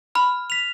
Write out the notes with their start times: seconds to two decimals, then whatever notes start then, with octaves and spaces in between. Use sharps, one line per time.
0.15 B5 F6
0.50 B6 F7